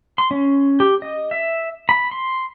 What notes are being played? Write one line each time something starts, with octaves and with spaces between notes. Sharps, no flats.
C6
C#4
G4
D#5
E5
B5
C6